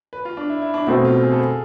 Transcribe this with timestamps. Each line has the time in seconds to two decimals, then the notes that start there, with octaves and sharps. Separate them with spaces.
0.13 B4
0.25 F4
0.37 D4
0.49 E4
0.62 E4
0.74 D4
0.86 B2 A3 C4 E4
1.05 F4
1.23 G#4
1.32 A4
1.42 G#4